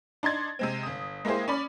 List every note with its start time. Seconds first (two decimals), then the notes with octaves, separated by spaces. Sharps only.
0.23 D4 D#4 C6 G#6 A6
0.59 C3 G#3 C4
0.83 G1 D#6
1.25 G#3 A#3 E4 G4 G#4 C5
1.48 C#4 D5 B5